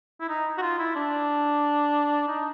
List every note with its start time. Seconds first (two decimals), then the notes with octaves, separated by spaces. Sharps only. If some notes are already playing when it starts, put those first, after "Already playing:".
0.20 E4
0.29 D#4
0.58 F#4
0.62 F4
0.79 E4
0.96 D4
2.28 D#4